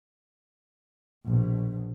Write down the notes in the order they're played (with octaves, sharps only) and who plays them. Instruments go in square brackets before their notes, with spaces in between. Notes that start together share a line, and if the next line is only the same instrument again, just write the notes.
[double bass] A#1 B2